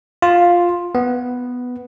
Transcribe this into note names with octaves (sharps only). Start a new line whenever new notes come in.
F4
B3